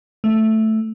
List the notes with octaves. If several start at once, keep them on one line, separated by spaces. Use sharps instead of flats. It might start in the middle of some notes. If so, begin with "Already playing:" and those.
A3